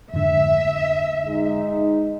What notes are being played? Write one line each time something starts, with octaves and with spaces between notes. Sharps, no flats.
F2 G#2 D3 E5
G#3 D#4